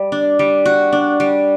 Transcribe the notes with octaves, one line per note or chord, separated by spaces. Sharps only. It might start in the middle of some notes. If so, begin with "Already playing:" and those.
Already playing: G3
D4
G3
F#4
D4
G3